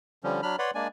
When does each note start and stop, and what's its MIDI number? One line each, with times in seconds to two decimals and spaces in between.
0.24 0.41 50
0.24 0.41 53
0.24 0.41 55
0.24 0.41 61
0.43 0.56 54
0.43 0.56 62
0.43 0.56 83
0.43 0.56 89
0.59 0.71 71
0.59 0.71 73
0.59 0.71 74
0.59 0.71 78
0.59 0.71 83
0.59 0.71 84
0.75 0.88 56
0.75 0.88 58
0.75 0.88 62
0.75 0.88 74
0.75 0.88 80